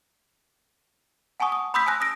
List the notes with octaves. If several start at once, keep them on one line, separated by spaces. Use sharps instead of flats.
F#5 G#5 A5 C#6 D#6
D#6
B5 C6 D#6 E6 G6 B6
G#5 A5 E6 F#6 A#6
D#6 E6 A#6 D7